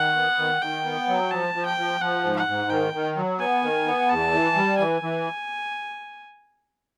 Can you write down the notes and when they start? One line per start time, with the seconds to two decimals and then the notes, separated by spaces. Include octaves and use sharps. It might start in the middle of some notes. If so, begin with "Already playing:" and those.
Already playing: D#3 F#5
0.15 B3
0.38 D#3
0.62 D#3 G5
0.85 B3
1.08 F#3
1.31 F3 A5
1.54 F3
1.66 G5
1.77 F3
2.01 F3 F#5
2.24 G#2
2.36 F#5
2.47 G#2
2.70 D#3 G5
2.93 D#3
3.17 F#3
3.39 B3 G#5
3.63 D#3
3.86 B3
4.10 E2 A5
4.32 E3
4.56 G3
4.78 E3 G#5
5.02 E3